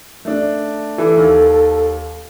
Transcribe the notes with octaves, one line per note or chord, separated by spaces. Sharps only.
A3 D4
E3 A4
D#2